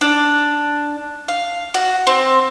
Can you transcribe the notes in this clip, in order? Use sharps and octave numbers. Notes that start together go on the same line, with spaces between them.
D4
F5
F#4
C4